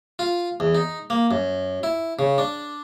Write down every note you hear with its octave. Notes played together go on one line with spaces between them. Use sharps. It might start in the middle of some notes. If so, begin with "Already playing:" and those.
F4
E2
D#4
A#3
F#2
E4
C#3
D4